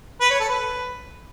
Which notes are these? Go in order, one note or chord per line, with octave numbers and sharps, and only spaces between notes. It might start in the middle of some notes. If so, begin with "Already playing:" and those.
B4
C#5
A4
B4